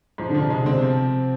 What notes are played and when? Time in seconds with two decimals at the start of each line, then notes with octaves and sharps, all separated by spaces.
0.18 G#2 F3
0.29 D3
0.35 F3
0.40 C3
0.50 C3 G#3
0.61 D3
0.66 C4
0.71 C3
0.82 F3